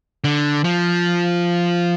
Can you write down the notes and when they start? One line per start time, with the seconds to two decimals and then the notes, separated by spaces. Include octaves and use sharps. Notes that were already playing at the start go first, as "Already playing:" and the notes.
0.24 D3
0.64 F3